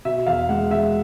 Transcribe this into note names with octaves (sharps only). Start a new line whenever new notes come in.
B2 E5
E2 F5
G#3 F#5
G#3 E5